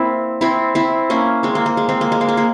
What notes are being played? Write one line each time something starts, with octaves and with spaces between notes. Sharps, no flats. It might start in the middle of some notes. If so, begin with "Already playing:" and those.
Already playing: A#3 C4 E4
C4 E4
C4 E4
A#3 C#4
G#3 C4
A#3
A#3
G#3
G#3 C4
A#3
G#3
A#3
G#3
A#3